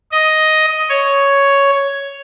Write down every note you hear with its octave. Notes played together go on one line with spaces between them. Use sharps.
D#5
C#5